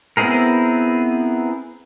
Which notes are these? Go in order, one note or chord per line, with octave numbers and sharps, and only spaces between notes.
B3 C4 E4 G#4 A#4